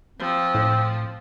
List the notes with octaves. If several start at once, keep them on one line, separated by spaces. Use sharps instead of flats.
F3 C4
A2